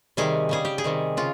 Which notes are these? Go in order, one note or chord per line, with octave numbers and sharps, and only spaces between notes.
C3 D#3 G3 G#4
C#3 G3 G#4
G4
G#4
C3 D#3 G3
C#3 F4